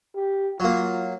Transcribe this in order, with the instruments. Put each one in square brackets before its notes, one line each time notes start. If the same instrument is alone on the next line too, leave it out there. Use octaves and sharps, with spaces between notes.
[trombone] G4
[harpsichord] F#3 A#3 [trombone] F4